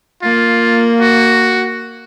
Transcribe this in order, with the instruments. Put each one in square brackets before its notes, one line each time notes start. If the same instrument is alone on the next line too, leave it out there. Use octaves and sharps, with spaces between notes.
[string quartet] A#3 [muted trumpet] F4
[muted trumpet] F#4